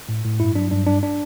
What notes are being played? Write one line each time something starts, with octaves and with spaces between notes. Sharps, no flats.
A2
A2
G2 E4
F#3 D4
G2 D4
G2 D4
D4